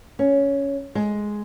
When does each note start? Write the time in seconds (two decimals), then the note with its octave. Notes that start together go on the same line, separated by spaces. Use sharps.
0.19 C#4
0.95 G#3